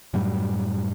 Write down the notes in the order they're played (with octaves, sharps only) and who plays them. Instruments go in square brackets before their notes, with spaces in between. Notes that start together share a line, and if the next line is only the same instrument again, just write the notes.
[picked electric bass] F#2 A2 F#3 G3